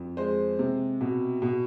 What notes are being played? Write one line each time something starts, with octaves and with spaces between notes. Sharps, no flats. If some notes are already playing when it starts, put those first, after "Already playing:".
Already playing: F2
G#3 C5
C3
B2
B2